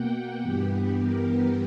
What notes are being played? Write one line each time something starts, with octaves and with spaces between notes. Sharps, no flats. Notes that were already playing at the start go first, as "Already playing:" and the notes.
Already playing: B2 A#3 F#5 G5
F#5
G2 E3 B3 G4
A#4